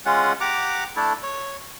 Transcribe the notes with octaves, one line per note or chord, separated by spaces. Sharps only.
G#3 C#4 F4 F#5
G4 F#5 A#5 D6
A3 D4 E4 A4
C#5